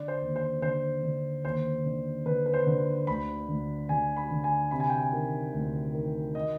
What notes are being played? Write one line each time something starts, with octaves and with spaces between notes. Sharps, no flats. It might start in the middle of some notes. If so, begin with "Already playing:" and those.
Already playing: D3 D5
C5
D#2
C5
D3 C5
D3
D#2 C5
D3
D3 B4
B4
C5
D3
D2 B5
D2
D3 G#5
B5
D3
G#5
C3 B5
G#5
G5
G#5
D#3
D2
D#3
D#5